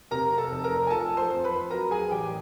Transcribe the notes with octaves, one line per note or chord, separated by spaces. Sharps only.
C3 A#4 A#5
A4 A5
F1
A#4 A#5
G#5
F3 A4 A5
C5 C6
F2
B4 B5
F#3 A#4 A#5
G#4 G#5
A1 G4 G5